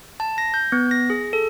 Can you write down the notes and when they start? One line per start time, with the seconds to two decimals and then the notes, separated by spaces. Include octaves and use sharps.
0.20 A5
0.38 A#6
0.54 G6
0.72 B3
0.91 A#6
1.10 G#4
1.33 A4